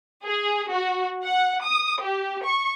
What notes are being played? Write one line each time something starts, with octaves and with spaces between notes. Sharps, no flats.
G#4
F#4
F#5
D#6
G4
C#6